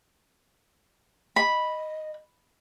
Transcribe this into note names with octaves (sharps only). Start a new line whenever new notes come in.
D#5 B5